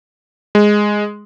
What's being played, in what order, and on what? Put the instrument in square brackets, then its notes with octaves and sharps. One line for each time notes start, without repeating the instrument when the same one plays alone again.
[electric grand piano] G#3